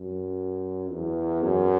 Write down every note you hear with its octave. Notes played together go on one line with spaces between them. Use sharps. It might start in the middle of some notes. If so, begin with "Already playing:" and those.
Already playing: F#2
E2
F#2